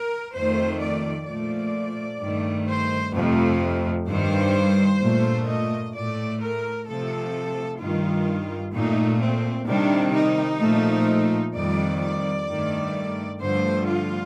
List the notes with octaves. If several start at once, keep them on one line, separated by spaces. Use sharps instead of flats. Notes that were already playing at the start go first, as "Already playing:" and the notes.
Already playing: A#4
F2 D#3 A3 C5
D5
A#2 F3 A3 D5
G2 D#3 A3
C5
F2 C3 F3 A3
G2 D#3 G3 C5
A#2 A3
D#5
A2 A3 D5
A#4
C3 F3 A3 A4
G2 D#3 G3 F4
A#2 A3 D#4
C4
C3 D#3 G3 D4
D#4
A#2 F3 A3
F2 D#3 G3 D5
D5
G2 D#3 A3
G2 D3 F3 A3 C5
F4